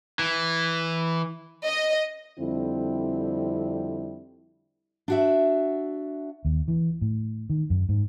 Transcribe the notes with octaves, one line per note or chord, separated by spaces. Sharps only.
E3
D#5
F2 D3 G3 C4 E4
D4 F#4 E5
D#2
E3
A2
D#3
F#2
G#2